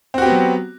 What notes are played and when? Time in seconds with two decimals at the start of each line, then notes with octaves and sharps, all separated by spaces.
0.14 C4
0.18 F#4
0.22 G4
0.26 B3
0.30 F#3